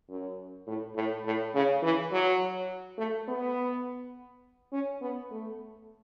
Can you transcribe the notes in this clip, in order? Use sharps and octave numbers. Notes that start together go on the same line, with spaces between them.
F#2
A2
A2
A2
C#3
E3
F#3
A3
B3
C#4
B3
A3